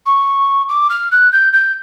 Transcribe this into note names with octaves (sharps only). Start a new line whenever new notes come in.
C#6
D6
F6
F#6
G6
G6